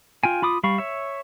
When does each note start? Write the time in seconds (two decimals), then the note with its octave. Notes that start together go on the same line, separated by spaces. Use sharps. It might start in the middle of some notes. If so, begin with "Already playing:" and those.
0.24 F4 G5 G#5
0.42 F4 B5 D6 D#6
0.64 G3 F5 B5 C#6
0.78 C#5 E5